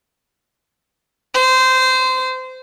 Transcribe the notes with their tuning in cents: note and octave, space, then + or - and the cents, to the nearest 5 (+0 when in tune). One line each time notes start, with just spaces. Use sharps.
C5 -20